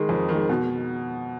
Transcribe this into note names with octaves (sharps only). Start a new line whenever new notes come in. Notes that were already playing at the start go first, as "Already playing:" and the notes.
Already playing: D#3 G#3
F2
D#3
G#3
B2